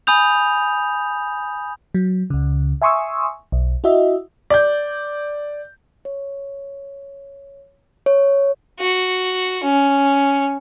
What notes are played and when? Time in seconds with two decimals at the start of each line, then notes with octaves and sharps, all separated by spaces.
0.07 G#5 B5 D#6 G6 F7
1.94 F#3
2.30 C#2 C#3
2.82 E5 G#5 C6 C#6 D#6 E6
3.52 B1
3.84 E4 F#4 D#5 E5
4.50 D5 G6
6.05 C#5
8.06 C#5
8.79 F#4
9.63 C#4